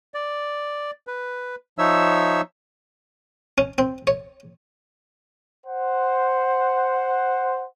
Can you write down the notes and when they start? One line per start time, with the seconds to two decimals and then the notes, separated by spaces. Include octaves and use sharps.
0.14 D5
1.07 B4
1.78 F3 D#4 C#5 E5 E6
3.58 C#4
3.78 C4
4.07 C#5
5.67 C5 F#5